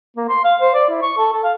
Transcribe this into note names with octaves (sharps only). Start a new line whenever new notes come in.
A#3
C6
F5
C5
D5
E4
C#6
A4
A4
F5